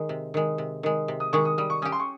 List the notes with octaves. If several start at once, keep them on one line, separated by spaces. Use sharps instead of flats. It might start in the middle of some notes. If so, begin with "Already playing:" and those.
Already playing: D#3 G#3
C3
D#3 G#3
C3
D#3 G#3
C3
D#6
D#3 G#3 C#6
D#6
G3 D#6
C#6
C#4 G4 D#6
C6
C#6